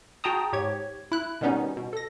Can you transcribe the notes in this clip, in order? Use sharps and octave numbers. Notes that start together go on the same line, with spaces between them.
F#4 G#4 G5 A5 A#5 D#6
G#2 G4 C#5 G#6
E4 F#6
B2 D#3 G3 B3 C#4 D#4
B2
A4 A#6